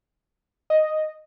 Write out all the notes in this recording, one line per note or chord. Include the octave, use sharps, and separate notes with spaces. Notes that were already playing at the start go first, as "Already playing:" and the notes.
D#5